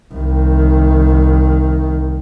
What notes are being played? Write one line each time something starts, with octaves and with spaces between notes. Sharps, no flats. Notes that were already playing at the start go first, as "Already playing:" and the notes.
C2 D#3